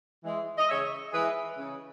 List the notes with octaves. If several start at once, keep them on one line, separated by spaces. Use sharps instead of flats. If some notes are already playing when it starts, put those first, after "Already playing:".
E3 G#3
D#5
C#3 C#5 E5
E3 G#3 G#4 B4
C#3